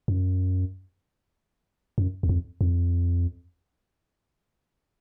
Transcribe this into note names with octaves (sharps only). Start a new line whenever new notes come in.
F#2
F#2
E2
F2
F2